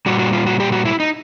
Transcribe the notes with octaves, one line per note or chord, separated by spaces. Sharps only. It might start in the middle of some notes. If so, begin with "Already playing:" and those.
A#2 G3 F#4
F#4
F4
F#4
G4
F#4
E4
D#4